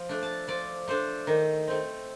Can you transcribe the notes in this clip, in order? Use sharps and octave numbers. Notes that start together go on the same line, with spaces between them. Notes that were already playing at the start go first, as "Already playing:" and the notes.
Already playing: F3
A3 D4
A5
F3 D5
A3 D4 C5
D#3
A3 C4